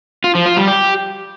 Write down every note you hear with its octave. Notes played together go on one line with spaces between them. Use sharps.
F4
F3
F4
G3
G4